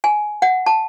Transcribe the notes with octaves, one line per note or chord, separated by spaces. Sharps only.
G#5
F#5
A5